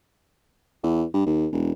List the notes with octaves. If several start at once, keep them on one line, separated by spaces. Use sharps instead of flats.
E2
G2
D#2
E1